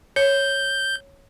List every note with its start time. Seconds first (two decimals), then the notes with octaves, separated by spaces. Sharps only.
0.16 C#5 G6